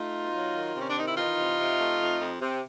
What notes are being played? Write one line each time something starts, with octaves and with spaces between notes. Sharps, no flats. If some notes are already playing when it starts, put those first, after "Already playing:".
Already playing: A3 D#4 F4
B2
F#3
D#3
C3
C#4
D4
D#3 D#4
E4
E3 D#4 F4
C3
C3
A3
F2
F2
C3